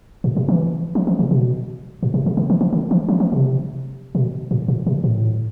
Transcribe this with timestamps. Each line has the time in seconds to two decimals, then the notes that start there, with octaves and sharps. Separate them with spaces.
0.24 A2
0.37 B2
0.49 E3
0.95 F3
1.07 E3
1.19 C3
1.31 B2
2.03 A2
2.14 B2
2.26 C3
2.37 D3
2.50 E3
2.61 E3
2.73 D3
2.91 E3
3.09 F3
3.20 E3
3.32 C3
4.15 B2
4.51 A2
4.68 A2
4.87 B2
5.04 A2